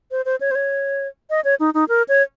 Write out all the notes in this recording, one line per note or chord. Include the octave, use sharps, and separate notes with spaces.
C5
C5
C#5
C5
C#5
D#5
C#5
D#4
D#4
A#4
C#5